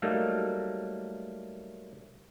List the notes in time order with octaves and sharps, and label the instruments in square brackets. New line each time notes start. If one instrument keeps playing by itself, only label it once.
[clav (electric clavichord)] F#3 G3 A3 A#3 D#4